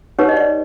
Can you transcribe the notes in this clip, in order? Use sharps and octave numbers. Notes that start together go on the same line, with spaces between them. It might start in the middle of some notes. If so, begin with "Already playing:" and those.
D#4 G4 B4 C#5
D#5
D5